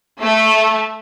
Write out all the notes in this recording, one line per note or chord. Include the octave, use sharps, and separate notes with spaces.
A3